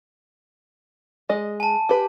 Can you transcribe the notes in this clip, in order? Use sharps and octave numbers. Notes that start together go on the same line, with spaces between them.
G#3 D#5
G#5 A5
G4 B4